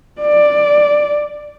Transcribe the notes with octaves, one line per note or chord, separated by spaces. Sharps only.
D5